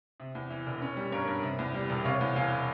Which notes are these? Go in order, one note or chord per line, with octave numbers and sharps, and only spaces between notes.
C3
E2
E3
E1
C#4
G3
G2 A#4 C#5
G2
C3
E2
G3
E1
C3 C#5 F5
E2
E1 F5 G#5